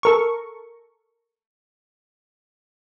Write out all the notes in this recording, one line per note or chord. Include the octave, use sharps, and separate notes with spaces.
A4 A#4 C#6